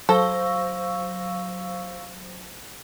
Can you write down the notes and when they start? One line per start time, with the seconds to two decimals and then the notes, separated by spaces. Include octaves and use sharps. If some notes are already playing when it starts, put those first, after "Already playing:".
0.09 F#3 A4 C5 F5 C#6 E6 A#6